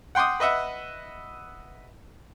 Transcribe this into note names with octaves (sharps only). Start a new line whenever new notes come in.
F#5 G5 C6 D6 D#6
B4 D#5 E5 F#5